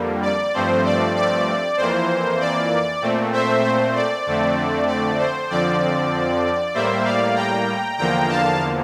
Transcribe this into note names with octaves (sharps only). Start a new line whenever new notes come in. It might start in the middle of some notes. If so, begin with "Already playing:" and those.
Already playing: F2 D3 G3 A#3
D5
G2 F3 A3 C4 C5
D5
D5
F2 E3 A#3 C5
D5
A#2 A3 C4
C5 E5
C5
D5
F2 D3 A3 C4
D5
C5
F2 D3 F3 C4 D5
A2 G3 A#3 C5 E5
D5 F5
G5 A#5
E2 D3 F3 A#3 G5 A#5
F5 A5